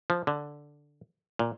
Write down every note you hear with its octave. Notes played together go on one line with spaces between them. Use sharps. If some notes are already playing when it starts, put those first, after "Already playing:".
F3
D3
A#2